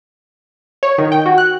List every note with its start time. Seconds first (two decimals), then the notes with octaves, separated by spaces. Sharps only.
0.83 C#5
0.98 D#3
1.12 G5
1.26 F#4
1.38 F#6